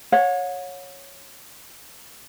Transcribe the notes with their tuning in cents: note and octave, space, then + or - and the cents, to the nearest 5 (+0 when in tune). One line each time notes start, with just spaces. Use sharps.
C#5 -5 F#5 -45